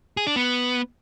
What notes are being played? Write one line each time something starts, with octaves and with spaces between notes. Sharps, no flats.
G#4
D4
B3